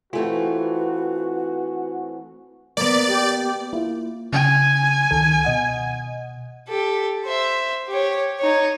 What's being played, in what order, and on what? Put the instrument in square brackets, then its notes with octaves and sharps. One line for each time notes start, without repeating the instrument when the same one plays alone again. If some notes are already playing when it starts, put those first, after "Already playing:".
[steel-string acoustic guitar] E3 A3 C4 [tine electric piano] F4 [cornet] F#4 [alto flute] B4
[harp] A#3 B3 [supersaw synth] D5
[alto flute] G4
[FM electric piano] A#3 E4 F4
[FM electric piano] C#3 [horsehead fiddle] G#5
[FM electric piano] C#2 D#3 A4
B2 D#5 F#5
[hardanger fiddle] G4 A4
C5 E5
G4 C#5
D#4 C#5